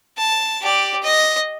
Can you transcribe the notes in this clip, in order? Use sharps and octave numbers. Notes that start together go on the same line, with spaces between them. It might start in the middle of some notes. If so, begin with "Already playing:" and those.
A5
G4 D5
D#5